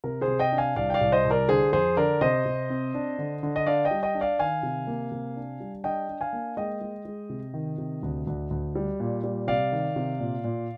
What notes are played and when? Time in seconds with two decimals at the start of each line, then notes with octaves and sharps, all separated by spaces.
0.04 C3 A#4
0.21 G#4 C5
0.28 C3
0.39 D#5 G5
0.52 D4
0.58 F5 G#5
0.76 C2 D5 F5
0.90 G5
0.94 D5 F5
1.01 C2
1.12 C5 D#5
1.25 C2
1.31 A#4 D5
1.48 D3 G#4 C5
1.73 F2 G#4 C5
1.97 D3 A#4 D5
2.21 C3 C5 D#5
2.45 C3
2.70 C4
2.94 D4
3.19 D3
3.43 D3
3.56 D#5
3.66 D4 D5 F5
3.85 D#5 G5
3.91 G3
4.03 D#5 G5
4.14 D4
4.21 D5 F5
4.39 D#3 F5 G#5
4.63 C3
4.87 A#3
5.12 C3
5.36 D4
5.60 G3
5.84 D4 D#5 G5
6.09 D4
6.21 F5 G#5
6.33 A#3
6.57 G#3 D#5 G5
6.81 G#3
7.05 G#3
7.30 C3
7.54 D#3
7.78 C3
8.03 D2
8.27 D2
8.50 D2
8.75 G3
9.00 A#2
9.24 G3
9.47 C3 D5 F5
9.72 D#3
9.96 C3
10.20 A#2
10.44 A#2